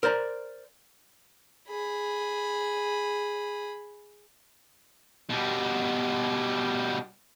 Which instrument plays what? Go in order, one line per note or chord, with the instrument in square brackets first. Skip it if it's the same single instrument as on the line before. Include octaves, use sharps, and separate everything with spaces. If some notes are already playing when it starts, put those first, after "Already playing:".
[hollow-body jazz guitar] A#4 C5 D5 A#5
[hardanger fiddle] G#4 B5
[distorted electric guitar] B2 G3